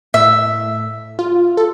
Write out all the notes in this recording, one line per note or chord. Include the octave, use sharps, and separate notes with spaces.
A2 E5
F4
A4